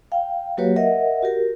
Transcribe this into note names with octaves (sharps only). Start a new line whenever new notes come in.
F5 G5
F#3 A#3 F#4 G4 B4 C#5
A#4 D#5 E5 F#5
F#4 G4 A#4